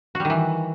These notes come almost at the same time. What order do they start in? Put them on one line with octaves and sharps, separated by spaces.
F#4 G3 D#3 E3